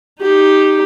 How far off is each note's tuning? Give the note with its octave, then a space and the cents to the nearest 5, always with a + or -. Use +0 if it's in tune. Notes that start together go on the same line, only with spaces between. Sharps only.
D#4 +0 G4 +0